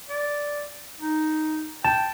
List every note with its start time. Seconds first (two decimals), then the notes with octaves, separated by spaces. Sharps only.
0.09 D5
1.01 D#4
1.85 G5 A5